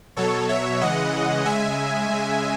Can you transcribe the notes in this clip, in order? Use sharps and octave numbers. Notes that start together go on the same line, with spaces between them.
B2 F#3 A4 C#5
C#5 E5
C#3 E3 G#3 D#5 F#5
C#3 G#3 E5 G#5
C#3 G#3